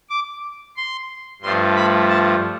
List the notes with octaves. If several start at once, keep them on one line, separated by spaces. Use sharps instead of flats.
D6
C6
G2 F3 A3 C6
B5
A5